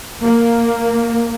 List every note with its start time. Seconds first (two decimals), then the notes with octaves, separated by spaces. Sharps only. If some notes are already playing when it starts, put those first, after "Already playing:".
0.23 A#3